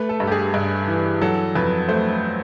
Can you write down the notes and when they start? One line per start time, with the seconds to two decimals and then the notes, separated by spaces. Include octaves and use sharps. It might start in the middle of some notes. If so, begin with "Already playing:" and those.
Already playing: A3 B4
0.09 A4
0.20 G2
0.27 G4
0.32 G#4
0.54 G2
0.88 E3
1.22 F#3 A4
1.55 F2 B4
1.89 A3 C5